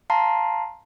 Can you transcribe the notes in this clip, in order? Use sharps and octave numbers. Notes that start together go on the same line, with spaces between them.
F5 A5 A#5 C6 C7